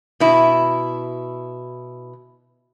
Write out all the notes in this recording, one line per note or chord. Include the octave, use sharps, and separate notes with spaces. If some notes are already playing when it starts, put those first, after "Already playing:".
B2 E4